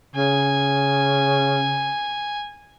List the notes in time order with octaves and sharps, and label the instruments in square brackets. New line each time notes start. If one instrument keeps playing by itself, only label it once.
[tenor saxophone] C#3 [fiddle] G#5